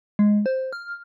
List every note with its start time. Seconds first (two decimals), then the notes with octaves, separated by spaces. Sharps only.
0.19 G#3
0.46 C5
0.73 F6